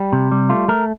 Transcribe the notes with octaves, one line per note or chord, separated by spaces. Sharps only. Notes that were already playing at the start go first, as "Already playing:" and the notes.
Already playing: G3
C3
G3
A3 F4
A3 A#4